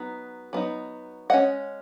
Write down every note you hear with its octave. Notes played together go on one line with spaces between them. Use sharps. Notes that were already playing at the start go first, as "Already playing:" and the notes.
Already playing: F#3 B3 D#4
F#3 B3 D#4
G#3 C#4 D#5 F#5